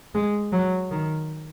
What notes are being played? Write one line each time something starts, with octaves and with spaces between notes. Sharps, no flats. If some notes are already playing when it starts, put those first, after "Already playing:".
G#3
F#3
D#3